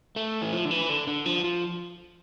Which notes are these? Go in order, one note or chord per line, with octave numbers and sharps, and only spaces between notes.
A3
E3
F3
D3
E3
D3
D3
F3
F3